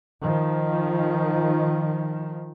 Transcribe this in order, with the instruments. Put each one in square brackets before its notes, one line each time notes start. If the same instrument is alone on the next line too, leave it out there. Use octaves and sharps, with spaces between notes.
[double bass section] D#3 F3